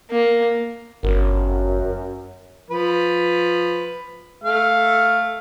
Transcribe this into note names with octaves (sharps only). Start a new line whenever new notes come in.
A#3
G1 F#2
F3 B4
A3 F5